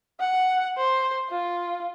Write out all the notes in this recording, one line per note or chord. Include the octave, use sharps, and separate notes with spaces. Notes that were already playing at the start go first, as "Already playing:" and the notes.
F#5
C5
F4